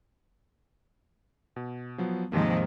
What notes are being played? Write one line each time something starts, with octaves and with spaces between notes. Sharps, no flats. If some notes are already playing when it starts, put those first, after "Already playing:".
B2
F3 F#3 B3
D#2 G#2 C3 D#3 F3 A#3